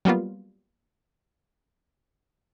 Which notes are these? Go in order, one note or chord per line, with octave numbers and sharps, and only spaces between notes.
F#3 G3 A#3 B3 F4